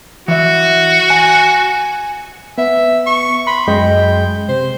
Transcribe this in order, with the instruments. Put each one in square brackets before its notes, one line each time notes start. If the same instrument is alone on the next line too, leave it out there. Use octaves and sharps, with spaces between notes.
[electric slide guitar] E3 E5 [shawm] F#4
[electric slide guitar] G#5
[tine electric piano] B3 [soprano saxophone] E5
[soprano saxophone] C#6
[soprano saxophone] B5 [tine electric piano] C6
[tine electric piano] F#2 G#3 D#5 [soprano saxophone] G5
[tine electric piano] C3 [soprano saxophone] C5